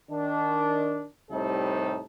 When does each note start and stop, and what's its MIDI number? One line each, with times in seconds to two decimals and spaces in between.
0.11 1.06 51
0.11 1.06 62
1.31 2.02 36
1.31 2.02 45
1.31 2.02 48
1.31 2.02 55
1.31 2.02 63
1.31 2.02 69